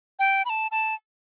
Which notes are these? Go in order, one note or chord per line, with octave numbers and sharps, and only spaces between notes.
G5
B5
A5
A5